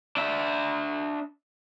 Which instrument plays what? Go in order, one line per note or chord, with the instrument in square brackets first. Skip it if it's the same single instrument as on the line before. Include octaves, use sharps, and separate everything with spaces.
[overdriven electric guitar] D4 E5